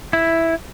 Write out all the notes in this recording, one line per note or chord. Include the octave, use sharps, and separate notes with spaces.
E4